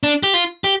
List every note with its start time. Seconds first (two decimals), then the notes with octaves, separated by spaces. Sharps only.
0.03 D4
0.23 G4
0.34 F4
0.64 G4